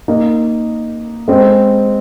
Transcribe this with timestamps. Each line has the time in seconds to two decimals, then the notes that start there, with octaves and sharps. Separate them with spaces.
0.08 A#3 D#4
1.28 G#3 C4